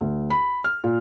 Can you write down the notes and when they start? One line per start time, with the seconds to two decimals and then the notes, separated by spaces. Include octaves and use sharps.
0.01 D2
0.30 B5
0.64 F6
0.84 A#2